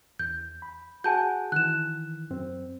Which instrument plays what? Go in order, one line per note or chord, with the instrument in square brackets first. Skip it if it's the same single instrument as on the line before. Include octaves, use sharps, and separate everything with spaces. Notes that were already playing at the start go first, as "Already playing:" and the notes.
[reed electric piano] E2 [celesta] G6
[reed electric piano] B5
[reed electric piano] F#4 G#4 F#5 [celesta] G#5 A5 G6
[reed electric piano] D#3 E3 [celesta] F#6 E7
[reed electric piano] F#2 C4